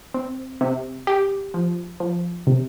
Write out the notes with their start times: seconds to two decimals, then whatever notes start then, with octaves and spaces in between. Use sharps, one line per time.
0.14 C4
0.61 C3
1.07 G4
1.54 F3
2.00 F3
2.47 C3